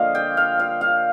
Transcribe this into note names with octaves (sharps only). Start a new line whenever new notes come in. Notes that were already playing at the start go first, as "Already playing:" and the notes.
Already playing: D3 F3 A#3 D4 D#5 F5
G5
F5
F5
F5